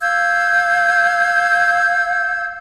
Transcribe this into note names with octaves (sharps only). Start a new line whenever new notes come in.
F5 E6 G6 G#6